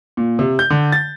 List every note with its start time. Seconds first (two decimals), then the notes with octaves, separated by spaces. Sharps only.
0.17 A#2
0.39 C3
0.59 G6
0.70 D3
0.92 A6